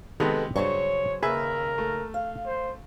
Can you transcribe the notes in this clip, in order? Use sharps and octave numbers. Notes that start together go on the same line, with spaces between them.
C3 D#3 G#3 B3 A4 B4 D#5
G2 C#3 F#3 C5 C#5 C#6
D#2 C#3 G#4 A#4 B4 E5
A3
F5
C5